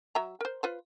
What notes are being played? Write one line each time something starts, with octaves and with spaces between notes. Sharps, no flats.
F#3 E5 A#5
A#4 C5
F4 B4 C5